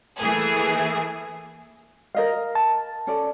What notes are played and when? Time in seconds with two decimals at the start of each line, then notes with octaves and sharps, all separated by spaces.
0.18 E3 A3 A#3 G#4
2.14 A#4 D#5 F5
2.55 A5
3.07 C#4 A4 D5